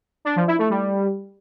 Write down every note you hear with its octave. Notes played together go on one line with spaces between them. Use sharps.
D4
F3
E4
A3
G3